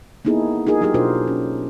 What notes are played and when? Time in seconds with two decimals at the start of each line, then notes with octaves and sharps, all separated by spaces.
0.25 A#3 B3 D#4 E4 G#4 A4
0.67 D#4 F4 G#4 A#4
0.81 F#3 D#4 E4 G4 G#4
0.94 B2 D4 F4 F#4 A#4 C5
1.27 C#4